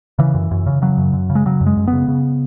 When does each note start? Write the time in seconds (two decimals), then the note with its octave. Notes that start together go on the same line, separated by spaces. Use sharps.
0.19 C#3 E3
0.35 F#2
0.51 F#2
0.66 C#3
0.82 C#3 F#3
0.98 F#2
1.13 F#2
1.30 C#3
1.35 G#3
1.45 C#3 F#3
1.61 F#2
1.66 G#3
1.77 F#2
1.87 B3
1.93 C#3
2.08 C#3